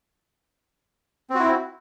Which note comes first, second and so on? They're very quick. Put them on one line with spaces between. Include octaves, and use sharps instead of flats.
C4 F#4 E4